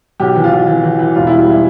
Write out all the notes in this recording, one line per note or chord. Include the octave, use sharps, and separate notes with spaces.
B1 G4
E3
F4
B1
E3
E3
E3
E1 F4
G3 E4
G3 E5